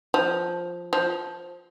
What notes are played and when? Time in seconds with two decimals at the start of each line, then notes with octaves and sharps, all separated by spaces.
0.14 F3
0.93 F3